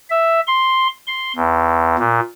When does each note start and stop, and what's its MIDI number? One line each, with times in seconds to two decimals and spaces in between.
0.10 0.40 76
0.47 0.87 84
1.07 1.32 84
1.36 1.96 40
1.99 2.20 46